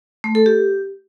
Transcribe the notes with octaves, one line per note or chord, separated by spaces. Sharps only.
A3
A4
G4